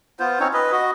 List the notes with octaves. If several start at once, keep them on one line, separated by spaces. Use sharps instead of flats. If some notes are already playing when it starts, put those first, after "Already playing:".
B3 F4 C5
C4 C#4 D#4 C#5
B4 D#5
F#4 D#5